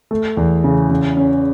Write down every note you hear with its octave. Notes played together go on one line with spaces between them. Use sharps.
A3
E2
C#3
C#3
C#4